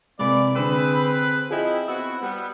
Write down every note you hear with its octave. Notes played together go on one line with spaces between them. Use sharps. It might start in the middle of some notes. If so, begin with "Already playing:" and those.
C3 E3 G#3 A#3 D5
D3 C4 G#4 B4 B5 E6
F3 C4 E4 G#4 D#5 G5
B3 C4 F#4 E6
G3 B3